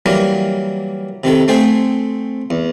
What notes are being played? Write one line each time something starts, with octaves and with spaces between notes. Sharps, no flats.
E3 F#3 G3 A#3 A#4
C3 D#3 E4 A4
A3 C4 G#4 A4 C5
E2